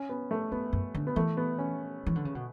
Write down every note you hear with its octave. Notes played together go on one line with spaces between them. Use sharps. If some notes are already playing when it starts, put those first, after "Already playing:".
Already playing: C#4
B3
A3
F#2 B3
F#2
D3
B3
E3 A3
B3
C#4
E3
D3
C#3
B2